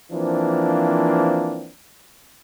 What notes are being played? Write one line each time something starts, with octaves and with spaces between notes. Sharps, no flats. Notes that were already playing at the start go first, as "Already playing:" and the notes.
E3 F3 A#3 C4 D4